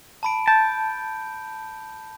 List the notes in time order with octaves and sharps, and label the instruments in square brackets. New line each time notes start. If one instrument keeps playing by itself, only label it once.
[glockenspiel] A5 B5 D7
[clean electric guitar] A5 [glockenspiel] G6